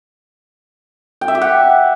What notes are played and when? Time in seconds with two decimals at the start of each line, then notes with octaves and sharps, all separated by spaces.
1.21 G5
1.28 E5
1.35 G4
1.41 F#5